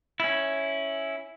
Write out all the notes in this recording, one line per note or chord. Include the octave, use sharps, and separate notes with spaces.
C#4 E4